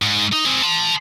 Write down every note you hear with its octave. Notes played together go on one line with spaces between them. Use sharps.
G#2
D#4
C4 G#4
A5 C6